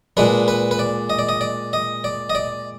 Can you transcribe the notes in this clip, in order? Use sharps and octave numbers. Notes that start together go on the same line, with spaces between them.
A#2 G#3 D4 B4
B4
B4
D5
D#5
D5
D#5
D5
D#5
D5
D#5
D5